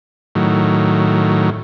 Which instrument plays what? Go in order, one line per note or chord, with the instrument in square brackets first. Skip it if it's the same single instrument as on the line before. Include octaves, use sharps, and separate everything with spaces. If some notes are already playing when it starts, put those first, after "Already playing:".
[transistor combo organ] A2 D#3 F#3